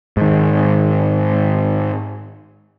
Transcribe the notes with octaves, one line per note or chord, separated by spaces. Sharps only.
G#2 D#3